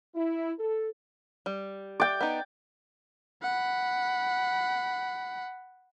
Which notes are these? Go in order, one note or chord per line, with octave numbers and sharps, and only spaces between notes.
E4
A4
G3
D5 G5
B3 D#4
F#5 B5